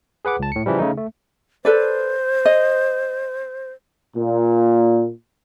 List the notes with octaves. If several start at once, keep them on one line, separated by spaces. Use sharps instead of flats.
G#4 B4 F#5 D6
C#2 A5
A2 C#7
C#3 E3 F3 G3
C#3 A3 D#4
A3
A4 B4 C5 D5
D#5
A#2